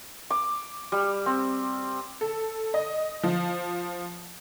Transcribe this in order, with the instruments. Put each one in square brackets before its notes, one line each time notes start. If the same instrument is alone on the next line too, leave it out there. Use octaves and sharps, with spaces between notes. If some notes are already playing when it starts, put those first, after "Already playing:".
[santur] D6
G3
C4
[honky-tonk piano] A4
D#5
F3